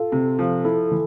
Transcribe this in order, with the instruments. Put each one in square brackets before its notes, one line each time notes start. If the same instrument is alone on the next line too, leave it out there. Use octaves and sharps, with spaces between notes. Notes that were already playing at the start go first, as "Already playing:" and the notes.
Already playing: [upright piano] F4 [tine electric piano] A4
[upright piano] C3
F3
[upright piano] E4 [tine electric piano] A4
[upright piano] E3